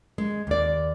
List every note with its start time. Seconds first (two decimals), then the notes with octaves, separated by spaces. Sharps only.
0.18 G#3
0.47 D#2 D5